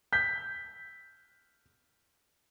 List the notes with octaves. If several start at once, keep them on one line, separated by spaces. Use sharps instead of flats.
G6 B6